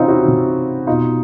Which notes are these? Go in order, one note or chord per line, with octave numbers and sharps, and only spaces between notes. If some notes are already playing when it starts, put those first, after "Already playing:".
Already playing: C3 E3 C4 C#4 D#4 F4
E4 F#4
C3 E3
B2 D#4 F4